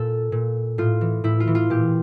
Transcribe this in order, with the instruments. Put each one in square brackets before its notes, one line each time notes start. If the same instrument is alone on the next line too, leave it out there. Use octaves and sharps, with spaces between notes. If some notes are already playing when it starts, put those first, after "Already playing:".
Already playing: [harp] A#2 A4
A#2
A2 F4
E3
A2 E4
F4
E3
F4
A#2 G4